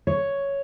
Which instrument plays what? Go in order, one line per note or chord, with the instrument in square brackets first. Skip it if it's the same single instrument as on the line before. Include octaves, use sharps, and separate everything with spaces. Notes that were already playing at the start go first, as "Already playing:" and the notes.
[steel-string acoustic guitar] C#5